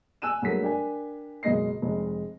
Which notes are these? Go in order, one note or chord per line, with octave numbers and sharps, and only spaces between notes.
G#5 E6 F#6 D#7 E7
G2 F#3 A3 A#3 G#4 B6
D4 G4 A#4 G#5
F#1 B2 G#3 D#5 A#6 C7
F1 G#3